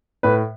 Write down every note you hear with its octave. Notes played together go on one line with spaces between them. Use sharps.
A2 B4